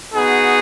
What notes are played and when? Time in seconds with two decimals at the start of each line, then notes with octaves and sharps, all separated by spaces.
0.14 B3 D#4 F#4 G#4